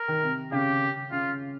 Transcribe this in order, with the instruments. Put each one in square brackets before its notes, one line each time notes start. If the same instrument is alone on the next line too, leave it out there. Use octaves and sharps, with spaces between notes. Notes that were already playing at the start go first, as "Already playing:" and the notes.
Already playing: [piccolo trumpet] A#4
[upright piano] D#3
C3
[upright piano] C#3 [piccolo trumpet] G4
[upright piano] C#3 [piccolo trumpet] F4